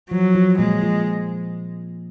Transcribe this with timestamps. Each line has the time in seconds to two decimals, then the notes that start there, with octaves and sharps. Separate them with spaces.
0.11 F3 F#3
0.35 F3
0.59 A#2 G#3
0.83 F3